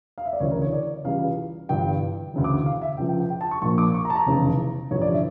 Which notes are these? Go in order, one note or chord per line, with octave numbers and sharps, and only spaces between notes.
F5
E5
D5
D2 C#3 E3 C#5
A#4
C#5
D5
C#2 C#3 E3 G3 F5
G1 G2 E3 G3 G5
D2 C#3 E3
D6
F5
E5
C#2 C#3 F3 G5
G5
G5
G5
A5
C#6
A#1 A#2 F3 C#6
D6
C#6
A#5
A5
A#5
F1 E2 C#3
A1 G2 D3 F3 C#5
D5
E5